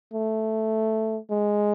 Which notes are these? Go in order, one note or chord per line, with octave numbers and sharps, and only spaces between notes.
A3
G#3